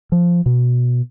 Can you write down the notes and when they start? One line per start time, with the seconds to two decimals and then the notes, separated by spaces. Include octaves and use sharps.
0.12 F3
0.46 B2